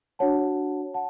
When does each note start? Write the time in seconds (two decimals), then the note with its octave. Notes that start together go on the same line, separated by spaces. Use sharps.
0.19 D4 F#4 C#5 F#5 A5
0.94 F#5 A5